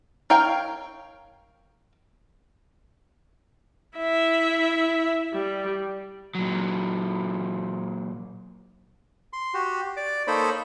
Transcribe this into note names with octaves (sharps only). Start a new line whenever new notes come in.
A#4 C#5 F5 G5
E4 E5
G3
A#2 F#3
C6
F#4 G4
D5 D6
A#3 D#4 A4 C5 C#5 B5